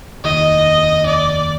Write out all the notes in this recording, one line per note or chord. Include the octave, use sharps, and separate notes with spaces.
F1 D#2 D#3 D#5
D5